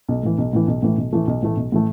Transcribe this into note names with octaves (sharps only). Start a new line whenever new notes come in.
B1
A2 E3
B1
A2 E3
B1
A2 E3 A3
B1
A2 E3 A3
B1
A2 E3 A3
B1
A2 E3 A3